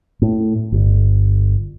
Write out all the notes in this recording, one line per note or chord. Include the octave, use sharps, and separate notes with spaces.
A2
G1